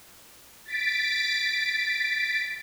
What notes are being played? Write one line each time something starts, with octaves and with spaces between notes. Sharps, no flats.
A6 B6 D7